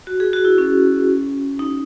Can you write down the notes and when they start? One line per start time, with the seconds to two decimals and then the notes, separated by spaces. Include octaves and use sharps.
0.07 F#4
0.20 G#4
0.33 F#4
0.45 E4
0.58 C#4
1.59 D#4